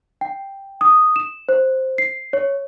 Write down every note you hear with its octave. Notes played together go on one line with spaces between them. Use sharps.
G5
D#6
E7
C5
C7
C#5